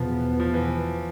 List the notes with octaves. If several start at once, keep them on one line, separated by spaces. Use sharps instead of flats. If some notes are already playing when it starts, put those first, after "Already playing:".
Already playing: E2 B2 F3 B3
F3
E3